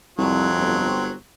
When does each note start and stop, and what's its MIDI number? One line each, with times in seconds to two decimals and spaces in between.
0.18 0.50 36
0.18 0.89 41
0.18 1.13 54
0.18 1.13 60
0.58 1.14 31